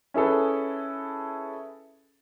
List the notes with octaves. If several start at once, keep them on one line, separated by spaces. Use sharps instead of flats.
C#4 E4 G#4 A4 B4